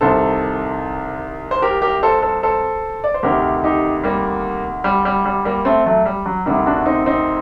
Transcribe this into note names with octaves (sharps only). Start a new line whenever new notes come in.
C2 C3 D#3 A4 C5
C5
G4 A#4
G4 A#4
A4 C5
A4 C5
A4 C5
D5
C5
D2 C3 D#3 G4 A#4
D#4 G4
G3 A#3
G3
G3
G3
G3 A#3
A3 C4
F#3 A3
G3
F#3
D2 C3 D#3 G3
D4 F#4
C4 D#4
C4 D#4